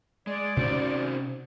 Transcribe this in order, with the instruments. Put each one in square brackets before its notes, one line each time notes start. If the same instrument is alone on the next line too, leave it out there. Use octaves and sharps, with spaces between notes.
[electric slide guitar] G#3 [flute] D5
[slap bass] C3 C#4 [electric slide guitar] D#4 F#4 C5